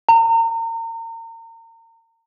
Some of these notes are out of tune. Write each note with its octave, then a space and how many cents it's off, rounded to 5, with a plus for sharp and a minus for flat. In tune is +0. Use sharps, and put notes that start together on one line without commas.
A#5 -35